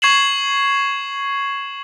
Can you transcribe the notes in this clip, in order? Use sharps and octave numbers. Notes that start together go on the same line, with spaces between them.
C#6 G#6 C7 E7 F#7